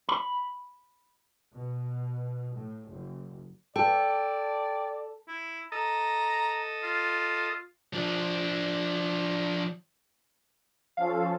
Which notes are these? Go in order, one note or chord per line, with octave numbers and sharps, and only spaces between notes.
B5
B2
A2
F#1
A4 D5 G5
E4
A4 D#5 A#5
F4
F3 D4
F3 C#4 A4 F5